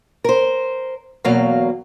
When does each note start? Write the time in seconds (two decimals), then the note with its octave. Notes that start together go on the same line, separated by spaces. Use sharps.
0.24 A#4 C5
1.25 E2 B2 F#3 A#3 F5